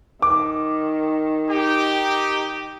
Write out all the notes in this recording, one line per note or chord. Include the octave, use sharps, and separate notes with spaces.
D#3 D6
D#4 G4